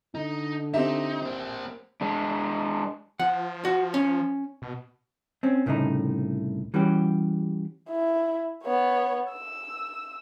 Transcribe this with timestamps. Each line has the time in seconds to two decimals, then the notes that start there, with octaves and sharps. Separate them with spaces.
0.15 D3 D#4
0.74 C4 D#4 G4 E5
1.22 A#3 C5
2.01 G#3 D4
3.19 F3 F#5
3.65 F#4
3.94 C#4
4.62 B2
5.43 C4 C#4
5.66 C2 A2 C#3 A3 D#4
6.74 E3 G3 C#4 F#4 G4
7.89 E4
8.63 B3 C#5
9.31 E6